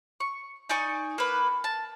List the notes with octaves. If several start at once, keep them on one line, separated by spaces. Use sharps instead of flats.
C#6
D#4 D5 G#5 C#6
A#3 B4
A5